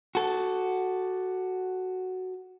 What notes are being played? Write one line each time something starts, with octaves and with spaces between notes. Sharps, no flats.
F#4 A4